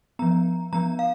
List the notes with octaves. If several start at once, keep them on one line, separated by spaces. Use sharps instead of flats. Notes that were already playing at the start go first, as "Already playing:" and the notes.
F3 B3 A#5
F3 B3 A#5
F5